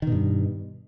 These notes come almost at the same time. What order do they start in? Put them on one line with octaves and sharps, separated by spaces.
D#3 B2 G2